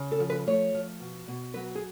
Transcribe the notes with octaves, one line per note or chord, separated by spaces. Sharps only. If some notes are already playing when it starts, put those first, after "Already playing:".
Already playing: C#3
A4
F3
B4
A3 C#5
F3
B2
B2
F#3 B4
G#4